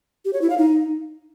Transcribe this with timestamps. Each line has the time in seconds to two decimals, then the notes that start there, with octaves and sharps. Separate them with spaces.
0.25 G4
0.33 C#5
0.41 E4
0.50 F5
0.58 D#4